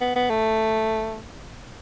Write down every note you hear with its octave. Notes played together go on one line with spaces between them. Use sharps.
B3
B3
A3